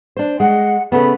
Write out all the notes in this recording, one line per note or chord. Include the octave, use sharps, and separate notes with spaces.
D4 C5
G#3 F#5
C#3 A3 B3 B5